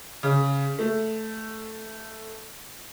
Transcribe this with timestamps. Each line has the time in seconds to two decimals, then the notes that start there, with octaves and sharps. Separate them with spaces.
0.23 C#3
0.79 A3